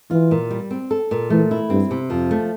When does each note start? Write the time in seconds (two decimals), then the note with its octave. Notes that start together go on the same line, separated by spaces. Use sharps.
0.11 E3 F4
0.31 A#2
0.51 G3
0.71 C4
0.91 A4
1.11 A#2
1.30 E3 A3
1.51 E4
1.70 G2 C4
1.91 C3
2.10 F2 F3
2.31 A3